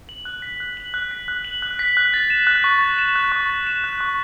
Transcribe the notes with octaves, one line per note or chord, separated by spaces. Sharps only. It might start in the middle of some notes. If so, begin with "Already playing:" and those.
F#7
F#6
B6
F#6
F#7
F#6
B6
F#6
F#7
F#6
B6
F#6
A6
E7
F#6
C#6
A6
E7
F#6
C#6
A6
E7
F#6
C#6